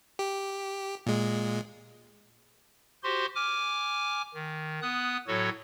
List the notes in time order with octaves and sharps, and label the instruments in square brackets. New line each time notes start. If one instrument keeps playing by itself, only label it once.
[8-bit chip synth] G4
A#2 G#3
[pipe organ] F#4 G4 C5 C6
G#5 D6 F6
D#3
B3 D#6 F#6
A2 F#3 F#4 A4 C#5